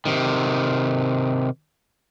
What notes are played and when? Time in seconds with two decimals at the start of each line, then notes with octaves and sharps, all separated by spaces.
0.05 C3 D#3